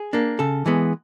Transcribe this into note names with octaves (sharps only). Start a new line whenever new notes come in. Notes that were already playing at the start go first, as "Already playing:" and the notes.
Already playing: G#4
A#3 D4
C#3 A4
E3 G#3 B3